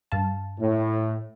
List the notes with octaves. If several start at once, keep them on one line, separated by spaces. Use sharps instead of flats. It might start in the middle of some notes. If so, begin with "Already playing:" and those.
G2 F5 A5
A2